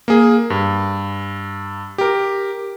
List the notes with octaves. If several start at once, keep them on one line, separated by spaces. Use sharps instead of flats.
A#3 G#4
G2
G4 A#4